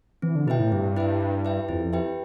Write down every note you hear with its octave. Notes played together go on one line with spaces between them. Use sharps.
E3 C4
D3
B2 E4 B4 E5 G5
A2
G2 C4
E4 B4 E5 G5
E4
G4 B4 E5 G5
F2 E4
F2
G4 B4 E5 G5